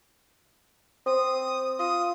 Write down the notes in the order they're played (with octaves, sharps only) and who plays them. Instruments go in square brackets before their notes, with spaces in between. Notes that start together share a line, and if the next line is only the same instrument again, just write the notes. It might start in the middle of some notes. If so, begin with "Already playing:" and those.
[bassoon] C4 [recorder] D#6
[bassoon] F4 [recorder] D#6